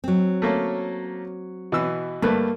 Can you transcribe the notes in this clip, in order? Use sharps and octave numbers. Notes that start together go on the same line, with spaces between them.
F#3 C4
A3 A#3 C#4
B2 E3 E6
G2 A3 A#3 B4